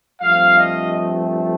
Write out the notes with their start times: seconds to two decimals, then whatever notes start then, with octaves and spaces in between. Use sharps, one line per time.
0.21 G2 F3 A3 C4 F5
0.59 D#5